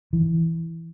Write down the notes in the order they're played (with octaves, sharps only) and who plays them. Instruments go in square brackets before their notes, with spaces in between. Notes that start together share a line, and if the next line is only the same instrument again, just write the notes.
[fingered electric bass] E3